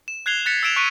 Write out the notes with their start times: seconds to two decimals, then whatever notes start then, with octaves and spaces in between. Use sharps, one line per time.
0.08 E7
0.26 F#6 G#6 C7 F7 G7
0.46 F#6 A6 B6 C#7
0.63 E6 G#6 D7 E7 F7
0.76 C#6 F#6 B6 D7 D#7